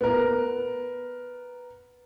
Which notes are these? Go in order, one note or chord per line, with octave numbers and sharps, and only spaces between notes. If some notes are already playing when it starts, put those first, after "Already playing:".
B3 A#4